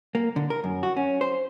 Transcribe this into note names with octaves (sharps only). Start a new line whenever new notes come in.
A#3
D3
A#4
F#2
F#4
C#4
C5